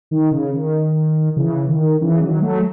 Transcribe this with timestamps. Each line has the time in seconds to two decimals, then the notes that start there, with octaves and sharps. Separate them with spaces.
0.11 D#3
0.31 C#3
0.53 D#3
1.36 C#3 E3
1.68 D#3
2.01 C#3 E3
2.21 D#3 F#3
2.42 F#3 A3